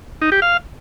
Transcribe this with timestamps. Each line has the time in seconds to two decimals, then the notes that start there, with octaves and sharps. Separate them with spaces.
0.22 D#4
0.32 G4
0.42 F5